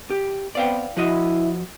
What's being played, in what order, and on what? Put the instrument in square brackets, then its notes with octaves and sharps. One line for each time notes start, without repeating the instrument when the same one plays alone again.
[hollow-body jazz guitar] G4
[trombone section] B3 C4 [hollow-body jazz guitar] D5 F5 G5
[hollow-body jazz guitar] F3 F#4 D#5 [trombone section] E4